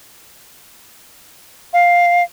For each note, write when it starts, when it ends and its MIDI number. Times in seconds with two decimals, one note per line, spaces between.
1.73 2.23 77